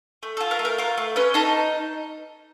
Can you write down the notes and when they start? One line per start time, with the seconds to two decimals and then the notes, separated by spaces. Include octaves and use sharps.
0.23 A3
0.37 A4
0.40 F4
0.51 A#4
0.59 A3
0.65 A#4
0.78 F4 A#4
0.97 A3
1.16 C#4 B4
1.34 D#4 A4